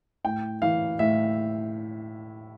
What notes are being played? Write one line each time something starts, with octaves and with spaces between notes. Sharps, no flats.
A2 G5
E3 F5
A2 E5